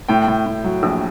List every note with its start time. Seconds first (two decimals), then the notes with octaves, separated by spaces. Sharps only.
0.08 A2 G5
0.28 A2
0.46 A2
0.64 F#3
0.83 A#1